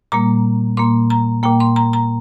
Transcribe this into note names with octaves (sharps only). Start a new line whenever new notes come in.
A#2 G3 A#3 A#5
A#2 A#3 C6
A#5
A#2 A#3 G5
C6
A#5
A#5